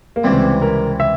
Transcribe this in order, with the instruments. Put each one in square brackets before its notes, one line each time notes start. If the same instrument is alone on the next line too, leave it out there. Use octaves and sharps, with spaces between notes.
[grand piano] A#3
[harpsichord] C#2 C3 E3 G3 [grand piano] C4
[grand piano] A#4
E5